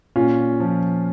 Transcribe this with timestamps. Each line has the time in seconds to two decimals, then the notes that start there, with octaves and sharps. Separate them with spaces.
0.16 A#2 C#4 F4
0.60 F3